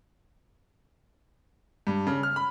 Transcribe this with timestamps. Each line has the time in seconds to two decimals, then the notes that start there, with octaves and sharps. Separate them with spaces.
1.87 G2
2.07 C#3
2.23 F6
2.36 B5